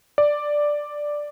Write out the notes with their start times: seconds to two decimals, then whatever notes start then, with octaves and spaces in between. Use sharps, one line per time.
0.18 D5